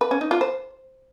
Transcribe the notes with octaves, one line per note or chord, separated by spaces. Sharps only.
B4
C#4
D#4
F4
C5